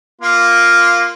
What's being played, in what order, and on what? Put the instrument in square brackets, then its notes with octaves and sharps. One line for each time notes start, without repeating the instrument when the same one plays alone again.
[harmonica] A#3 F4